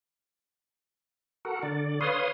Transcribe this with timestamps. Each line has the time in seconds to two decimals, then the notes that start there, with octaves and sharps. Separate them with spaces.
1.45 F#4 A4 A#4 F#5
1.63 D3 D5
2.01 B4 C#5 F5 C6 D#6